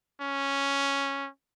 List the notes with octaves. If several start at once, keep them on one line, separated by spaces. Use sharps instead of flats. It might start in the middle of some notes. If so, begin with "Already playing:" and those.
C#4